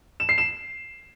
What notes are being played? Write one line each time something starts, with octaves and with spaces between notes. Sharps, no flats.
E7
C7
E7